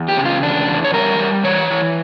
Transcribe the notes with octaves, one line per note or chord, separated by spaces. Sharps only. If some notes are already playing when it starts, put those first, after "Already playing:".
Already playing: E2
G4
C#3
F4
E2 D4
E2
C#5
G3 A#4
G3
E3 C#5
E3